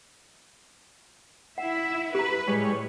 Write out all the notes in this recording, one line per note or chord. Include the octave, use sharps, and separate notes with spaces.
E4 E5 F#5
G4 B4 A#5
A2 G3 G#3 C#5